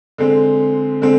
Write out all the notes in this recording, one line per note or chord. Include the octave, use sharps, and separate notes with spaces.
D3 G#3 C4
D3 G#3 C4